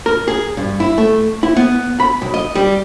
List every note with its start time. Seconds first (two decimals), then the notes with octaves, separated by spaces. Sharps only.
0.06 A#4
0.28 G#4
0.57 G2
0.80 E4
0.98 A3
1.43 E4
1.57 B3
2.00 B5
2.22 B1
2.34 D#5
2.55 G3